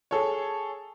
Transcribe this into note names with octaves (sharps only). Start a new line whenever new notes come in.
G#4 A4 C#5